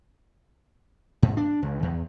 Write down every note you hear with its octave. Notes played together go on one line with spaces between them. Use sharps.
G#2
D4
C#2
E2